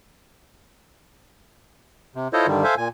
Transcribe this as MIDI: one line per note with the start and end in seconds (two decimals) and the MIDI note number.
2.15 2.28 48
2.33 2.47 64
2.33 2.47 65
2.33 2.47 69
2.33 2.47 72
2.33 2.47 73
2.33 2.47 75
2.47 2.64 43
2.47 2.64 50
2.47 2.64 51
2.47 2.64 55
2.64 2.75 69
2.64 2.75 72
2.64 2.75 76
2.64 2.75 77
2.64 2.75 80
2.77 2.88 46
2.77 2.88 80